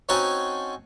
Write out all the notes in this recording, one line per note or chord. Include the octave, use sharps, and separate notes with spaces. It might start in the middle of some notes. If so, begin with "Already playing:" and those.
C4 C#4 D#4 F#4 G#5 A5